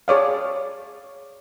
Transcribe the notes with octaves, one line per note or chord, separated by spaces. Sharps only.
G#4 C#5 D5 F5